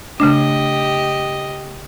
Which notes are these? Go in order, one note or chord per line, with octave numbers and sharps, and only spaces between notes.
C#3 A3 D4 G4 D#5